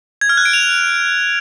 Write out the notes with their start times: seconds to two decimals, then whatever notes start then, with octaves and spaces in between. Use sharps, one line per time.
0.21 G#6
0.29 F6
0.37 F#6
0.45 D7
0.53 F7